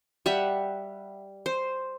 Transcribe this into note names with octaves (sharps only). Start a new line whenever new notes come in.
G3 E5 F#5
C5